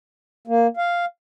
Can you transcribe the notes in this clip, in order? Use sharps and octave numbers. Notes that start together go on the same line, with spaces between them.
A#3
F5